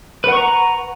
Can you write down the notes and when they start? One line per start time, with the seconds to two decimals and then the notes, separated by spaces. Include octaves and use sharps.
0.24 B4
0.28 F#5
0.32 C#6
0.37 A#5